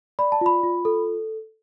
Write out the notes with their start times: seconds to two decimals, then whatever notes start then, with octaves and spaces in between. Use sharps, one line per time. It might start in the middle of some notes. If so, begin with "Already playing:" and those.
0.19 D5 B5
0.32 A5
0.41 F4 B5
0.63 F4
0.85 A4